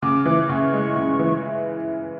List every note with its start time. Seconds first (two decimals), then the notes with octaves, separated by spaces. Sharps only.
0.03 C#3 D6
0.25 E3 D6
0.49 C#3 C#6
0.73 G#3
0.96 C#3
1.19 E3